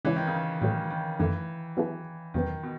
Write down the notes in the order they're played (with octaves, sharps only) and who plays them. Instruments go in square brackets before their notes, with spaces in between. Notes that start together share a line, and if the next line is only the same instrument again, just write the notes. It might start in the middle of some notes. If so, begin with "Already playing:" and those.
[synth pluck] C#3 G#3 C#4 E4 [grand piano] E3
[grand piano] D#3
C#3
D#3
[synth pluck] A2 F#3 A3 [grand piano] D#3
[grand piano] D#3
[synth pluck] F#2 D#3 A3 [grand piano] E3
[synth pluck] F#3 B3 E4 G#4
[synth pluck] E2 B2 F#3 B3 [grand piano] D#3
[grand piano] B2